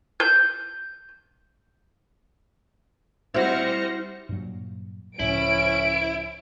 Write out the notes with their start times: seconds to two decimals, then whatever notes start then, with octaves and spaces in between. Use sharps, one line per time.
0.20 G6
3.34 G3 C4 E4 F#4 C5 F6 A#6 C#7
4.29 G2 A#2 F#3
5.20 C#2 A2 F3 C#4 E4 D7